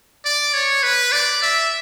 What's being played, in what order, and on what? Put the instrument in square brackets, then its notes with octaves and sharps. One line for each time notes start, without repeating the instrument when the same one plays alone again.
[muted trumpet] D5
C#5
B4
D5
E5